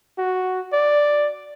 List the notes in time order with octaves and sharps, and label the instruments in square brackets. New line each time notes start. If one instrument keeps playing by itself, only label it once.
[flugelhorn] F#4
D5